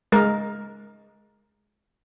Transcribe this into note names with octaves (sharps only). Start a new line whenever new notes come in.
G#3 A#4